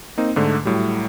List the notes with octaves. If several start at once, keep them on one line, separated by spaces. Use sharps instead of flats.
A#3 C4 D#4
G#2 D3 A3
A2 F#3 G3